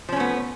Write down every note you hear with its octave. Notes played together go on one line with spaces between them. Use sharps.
F3 A3 B3 C#4